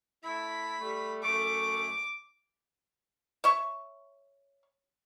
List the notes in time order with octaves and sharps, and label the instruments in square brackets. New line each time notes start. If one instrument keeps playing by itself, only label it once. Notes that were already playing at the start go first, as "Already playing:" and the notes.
[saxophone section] A3 E4 [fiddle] B5
[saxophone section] G3 A3
[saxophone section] F#2 A3 [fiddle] D6
[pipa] C#5 E5 C#6